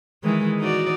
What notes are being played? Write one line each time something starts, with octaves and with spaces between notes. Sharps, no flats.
D#3 E3 G#3
D#4 F#4 D5